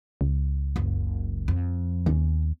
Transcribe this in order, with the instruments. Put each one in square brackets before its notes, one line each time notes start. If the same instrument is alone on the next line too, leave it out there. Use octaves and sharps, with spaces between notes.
[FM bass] C#2
[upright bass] F#1
F2
[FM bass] D#2 [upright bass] C#4